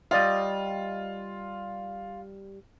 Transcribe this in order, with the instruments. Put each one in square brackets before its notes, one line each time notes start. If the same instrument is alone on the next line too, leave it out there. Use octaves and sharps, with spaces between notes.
[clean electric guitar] G3 D5 D#5 [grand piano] F4